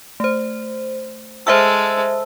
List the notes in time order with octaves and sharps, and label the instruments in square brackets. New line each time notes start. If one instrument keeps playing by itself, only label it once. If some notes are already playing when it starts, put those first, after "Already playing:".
[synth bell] A3 C5
[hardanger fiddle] G#3 A4 [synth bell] C5 E5 E6